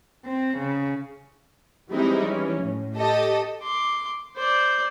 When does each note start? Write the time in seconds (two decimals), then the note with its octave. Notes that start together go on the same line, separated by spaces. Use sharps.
0.23 C4
0.57 C#3
1.89 E3 G3 G#3 C4 D#4 E4
2.25 E3 C#4
2.61 A2
2.95 G4 A4 D#5
3.62 C6 D6
4.36 C5 D5